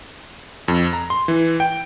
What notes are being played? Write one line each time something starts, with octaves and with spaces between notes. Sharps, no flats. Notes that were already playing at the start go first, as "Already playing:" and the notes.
F2
A#5
C6
E3
G5